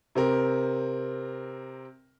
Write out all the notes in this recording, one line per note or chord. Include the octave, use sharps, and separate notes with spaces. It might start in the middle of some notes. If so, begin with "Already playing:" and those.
C3 C4 A#4